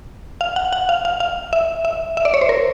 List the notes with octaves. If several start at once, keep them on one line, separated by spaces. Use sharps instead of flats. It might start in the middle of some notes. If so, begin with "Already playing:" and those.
F5
F#5
F#5
F5
F5
F5
E5
E5
E5
D5
C#5
C5
A#4